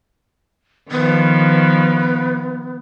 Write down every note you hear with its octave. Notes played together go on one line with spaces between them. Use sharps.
D#3 F3 B3